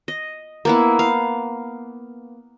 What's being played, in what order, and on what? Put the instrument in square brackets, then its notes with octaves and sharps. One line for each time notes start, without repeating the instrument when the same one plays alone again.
[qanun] D#5
A#3 B3 E4
F5